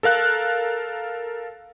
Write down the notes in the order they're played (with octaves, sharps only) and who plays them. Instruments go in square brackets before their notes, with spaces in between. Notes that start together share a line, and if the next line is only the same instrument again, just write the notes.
[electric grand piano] A4 A#4 F5 F#6